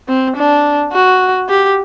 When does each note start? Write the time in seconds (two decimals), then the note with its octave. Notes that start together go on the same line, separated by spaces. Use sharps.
0.08 C4
0.36 D4
0.92 F#4
1.49 G4